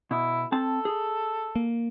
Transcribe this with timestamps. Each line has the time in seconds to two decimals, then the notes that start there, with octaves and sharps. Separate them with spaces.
0.11 B2 E4
0.52 C4 A4 A5
0.85 G#4
1.56 A#3